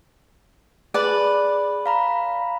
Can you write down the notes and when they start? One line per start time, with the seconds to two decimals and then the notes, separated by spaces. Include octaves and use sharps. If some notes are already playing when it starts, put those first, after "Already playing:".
0.94 G#4 B4 D5 A5
1.86 F5 A#5 B5